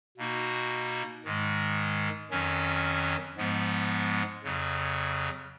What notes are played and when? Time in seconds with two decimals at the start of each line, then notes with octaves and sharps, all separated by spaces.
0.17 B2 A#3 D#4 F#4
1.24 G#2 D#3 G#3
2.31 F2 D#3 F#3 C#4
3.37 G#2 F3 G#3 B3
4.44 F2 C#3 F#3